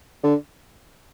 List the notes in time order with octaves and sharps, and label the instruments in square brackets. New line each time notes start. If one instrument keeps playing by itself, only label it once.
[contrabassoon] D3